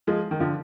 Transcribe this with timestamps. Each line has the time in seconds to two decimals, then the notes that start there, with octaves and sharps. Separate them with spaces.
0.07 F3 G#3
0.31 D#3
0.40 D3 F3